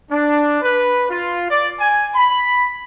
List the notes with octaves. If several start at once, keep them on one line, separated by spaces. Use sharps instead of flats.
D4
B4
F4
D5
G#5
B5